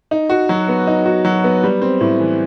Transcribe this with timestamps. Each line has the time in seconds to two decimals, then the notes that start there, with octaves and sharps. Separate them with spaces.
0.11 D#4
0.29 F#4
0.49 F#3
0.68 B3
0.87 D#4
1.05 F#4
1.25 F#3
1.44 B3
1.64 G3
1.82 C4
2.01 A2
2.20 E3